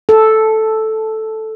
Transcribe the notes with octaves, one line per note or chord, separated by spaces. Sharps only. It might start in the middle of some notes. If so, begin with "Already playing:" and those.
A4